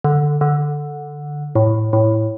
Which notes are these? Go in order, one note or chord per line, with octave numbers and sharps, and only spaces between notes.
D3
D3
A2
A2